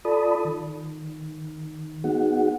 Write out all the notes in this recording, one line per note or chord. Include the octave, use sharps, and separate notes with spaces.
F4 A4 D5 A5 B5 D#6
D#3
B3 D#4 F#4 G#4 F#5